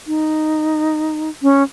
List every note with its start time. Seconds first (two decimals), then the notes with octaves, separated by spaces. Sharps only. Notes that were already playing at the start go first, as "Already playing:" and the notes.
0.07 D#4
1.43 C#4